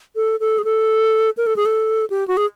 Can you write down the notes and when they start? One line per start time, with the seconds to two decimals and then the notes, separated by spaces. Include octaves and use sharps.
0.16 A4
0.40 A4
0.58 G#4
0.64 A4
1.37 A#4
1.46 A4
1.56 G#4
1.66 A4
2.10 G4
2.28 F#4
2.37 G#4